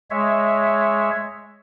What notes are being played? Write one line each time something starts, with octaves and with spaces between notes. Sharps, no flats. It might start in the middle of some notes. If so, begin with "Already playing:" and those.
G#3 C#5 E5